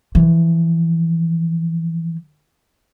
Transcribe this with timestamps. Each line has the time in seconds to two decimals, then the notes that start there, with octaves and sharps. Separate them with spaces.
0.15 E3 F3